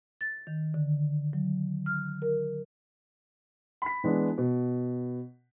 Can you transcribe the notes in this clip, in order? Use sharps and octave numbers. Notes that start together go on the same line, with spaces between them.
A6
D#3
D3
F#3
F6
A#4
B5 B6
E3 G#3 B3 D4
B2